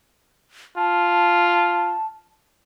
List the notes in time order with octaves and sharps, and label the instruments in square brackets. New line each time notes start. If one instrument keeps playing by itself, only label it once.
[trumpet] F4 [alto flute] A5